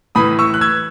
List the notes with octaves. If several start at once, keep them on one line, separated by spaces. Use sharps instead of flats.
A2 E3 B5 D#6
C#6 E6
F#6
E6 G#6